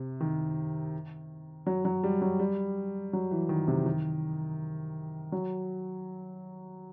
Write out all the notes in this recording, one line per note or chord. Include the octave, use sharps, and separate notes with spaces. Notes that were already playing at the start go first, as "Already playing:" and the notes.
Already playing: C3
D#3
F#3
F#3
G3
F#3
G3
F#3
E3
D#3
C3
D#3
F#3